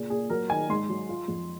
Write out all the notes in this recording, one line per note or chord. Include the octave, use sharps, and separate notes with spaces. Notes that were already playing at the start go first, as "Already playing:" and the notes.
Already playing: A#2 C#3 G#4
A#2 G#4
F#3 A#4
D#3 G#5
G#2 C6
F#3
F4
F2